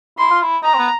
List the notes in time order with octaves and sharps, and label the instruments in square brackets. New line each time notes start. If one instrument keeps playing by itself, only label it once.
[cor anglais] E4 [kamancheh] C6
[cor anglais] F4
E4
[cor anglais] D#4 [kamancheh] A#5
[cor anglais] C4
B3